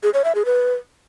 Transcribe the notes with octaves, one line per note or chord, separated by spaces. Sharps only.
G#4
C#5
E5
G#4
B4